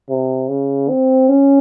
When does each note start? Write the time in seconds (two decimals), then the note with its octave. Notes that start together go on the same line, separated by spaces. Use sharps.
0.09 C3
0.48 C#3
0.89 C4
1.29 C#4